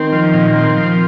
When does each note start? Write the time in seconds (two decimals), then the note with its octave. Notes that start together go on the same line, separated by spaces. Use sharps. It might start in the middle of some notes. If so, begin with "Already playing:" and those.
Already playing: D#3 C4
0.12 F3
0.34 A#2
0.54 C4
0.76 F3